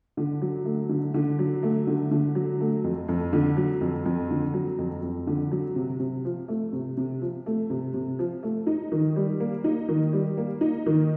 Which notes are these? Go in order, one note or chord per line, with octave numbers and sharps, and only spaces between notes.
D3
F#3
A3
D3
D3
F#3
A3
D3
D3
F#3
A3
F2
F2
D3
F#3
F2
F2
D3
F#3
F2
F2
D3
F#3
C3
C3
F3
A3
C3
C3
F3
A3
C3
C3
F3
A3
D#4
D#3
G3
A#3
D#4
D#3
G3
A#3
D#4
D#3